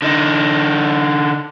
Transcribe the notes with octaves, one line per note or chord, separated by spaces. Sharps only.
D3 D#4